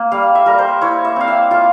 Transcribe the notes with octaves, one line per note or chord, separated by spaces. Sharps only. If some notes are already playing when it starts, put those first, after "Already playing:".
Already playing: A#3
G3 F5
E5
G3 A#4
C5
E4 C#5
E5
C4 F5
E5
F4 F5